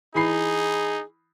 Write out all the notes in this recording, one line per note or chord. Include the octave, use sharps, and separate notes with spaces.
E3 D#4 G#4 B5 C7